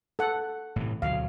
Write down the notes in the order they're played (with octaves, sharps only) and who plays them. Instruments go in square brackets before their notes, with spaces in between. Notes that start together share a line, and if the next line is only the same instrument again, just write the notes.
[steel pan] A4 F#5
[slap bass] A2 C3 E3
[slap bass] D2 B2 F#3 [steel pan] F5